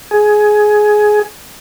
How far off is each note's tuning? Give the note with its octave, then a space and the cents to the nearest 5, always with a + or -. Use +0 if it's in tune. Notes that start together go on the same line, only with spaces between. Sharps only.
G#4 +15